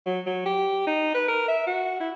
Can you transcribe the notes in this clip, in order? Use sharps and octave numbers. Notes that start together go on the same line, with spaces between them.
F#3
F#3
G4
D#4
B4
A#4
E5
F#4
E4